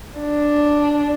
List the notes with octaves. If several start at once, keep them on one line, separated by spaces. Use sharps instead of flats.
D4